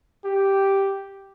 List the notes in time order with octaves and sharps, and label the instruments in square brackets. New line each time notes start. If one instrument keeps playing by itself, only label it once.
[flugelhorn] G4